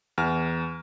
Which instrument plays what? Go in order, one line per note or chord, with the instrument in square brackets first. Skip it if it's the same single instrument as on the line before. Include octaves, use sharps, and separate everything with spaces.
[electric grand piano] E2 F6